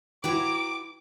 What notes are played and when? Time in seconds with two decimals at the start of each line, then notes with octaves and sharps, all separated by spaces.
0.24 E4 F#4 B4 G5 A#5 D6